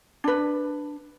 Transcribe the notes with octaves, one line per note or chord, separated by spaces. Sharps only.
D4 B4